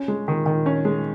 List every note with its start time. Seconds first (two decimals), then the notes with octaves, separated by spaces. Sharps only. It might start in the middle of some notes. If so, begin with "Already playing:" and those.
Already playing: C#4
0.08 G#3
0.28 D#3
0.46 D#3
0.66 C#4
0.85 G#3